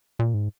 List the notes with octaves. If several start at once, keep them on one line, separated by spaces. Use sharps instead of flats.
A#2
G#2